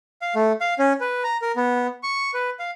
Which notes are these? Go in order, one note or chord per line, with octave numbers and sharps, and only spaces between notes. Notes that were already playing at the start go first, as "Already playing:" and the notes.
F5
A3
F5
C#4
B4
A#5
A#4
B3
C#6
B4
F5